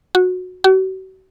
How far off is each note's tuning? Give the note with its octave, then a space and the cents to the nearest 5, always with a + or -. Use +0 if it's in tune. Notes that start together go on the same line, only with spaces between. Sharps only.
F#4 -20
F#4 +40